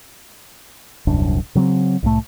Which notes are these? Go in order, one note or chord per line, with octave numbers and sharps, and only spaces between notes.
D#1 C2 F#2 D4
C#3 F#3 A#3 C4
C2 A2 A3